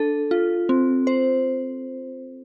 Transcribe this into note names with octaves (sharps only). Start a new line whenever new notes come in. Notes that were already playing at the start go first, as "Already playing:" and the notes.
Already playing: D4 A4
F4
C4
C5